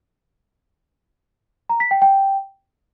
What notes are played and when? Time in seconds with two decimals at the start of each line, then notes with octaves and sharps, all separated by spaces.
1.69 A#5
1.80 B6
1.91 G5
2.02 G5